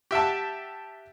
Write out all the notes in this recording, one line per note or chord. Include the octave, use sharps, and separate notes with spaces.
G4 E5 F#5 A5